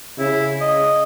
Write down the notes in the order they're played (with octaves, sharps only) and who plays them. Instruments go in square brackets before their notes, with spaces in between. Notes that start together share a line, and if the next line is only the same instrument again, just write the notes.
[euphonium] C#3 [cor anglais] E4
[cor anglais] D#5